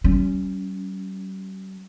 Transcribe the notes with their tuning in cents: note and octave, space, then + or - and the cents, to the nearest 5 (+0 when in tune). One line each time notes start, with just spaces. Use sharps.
G3 -45 C#4 +0